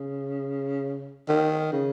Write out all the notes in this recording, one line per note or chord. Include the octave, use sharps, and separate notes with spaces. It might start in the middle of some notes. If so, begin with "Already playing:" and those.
Already playing: C#3
D#3
C#3